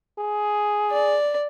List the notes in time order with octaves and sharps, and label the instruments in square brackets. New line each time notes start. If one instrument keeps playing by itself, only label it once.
[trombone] G#4
[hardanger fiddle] D5